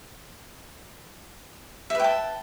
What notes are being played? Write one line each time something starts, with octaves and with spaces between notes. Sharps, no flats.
B4 E5 G5 A5